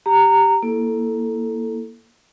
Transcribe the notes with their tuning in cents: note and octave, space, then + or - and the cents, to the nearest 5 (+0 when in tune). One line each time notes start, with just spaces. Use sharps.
G4 +0 A#5 -15
A#3 +10 E4 +0 A4 +0